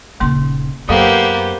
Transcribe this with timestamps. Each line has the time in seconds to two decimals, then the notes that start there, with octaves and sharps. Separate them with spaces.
0.20 D#1 C#3 A#3 C6
0.89 F#2 F#3 A#3 B3 G4 A4 C5 F5